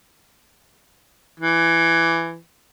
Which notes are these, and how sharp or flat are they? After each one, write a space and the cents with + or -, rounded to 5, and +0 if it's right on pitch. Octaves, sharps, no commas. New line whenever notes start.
E3 +15